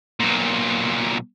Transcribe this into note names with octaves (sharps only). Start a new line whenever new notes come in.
B1 A#2